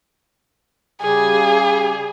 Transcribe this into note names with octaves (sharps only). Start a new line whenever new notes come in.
C#3 G3 G4 G#4